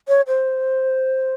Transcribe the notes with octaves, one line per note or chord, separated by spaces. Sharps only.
C#5
C5